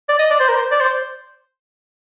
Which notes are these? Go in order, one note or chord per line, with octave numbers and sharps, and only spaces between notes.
D5
D#5
D5
C5
A#4
C5
D5
C5